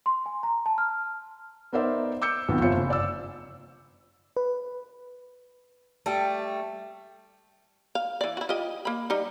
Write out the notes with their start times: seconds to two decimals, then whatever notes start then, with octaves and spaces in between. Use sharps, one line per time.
0.06 C6
0.26 G#5
0.43 A#5
0.66 A5
0.78 F6
1.73 B3 D#4 A#4 C5 D5 E5
2.22 D6 E6 G6 C#7
2.48 B1 F2 D#3 B3
2.61 G1 F2 F4 C5 C#5 C#7
2.77 F#1
2.90 D5 E6
4.37 B4
6.06 G3 A3
7.95 F5
8.21 E3 D5
8.37 E4 F#4
8.49 F4 G4 D#5
8.85 A#3 B5
9.10 G3 D#4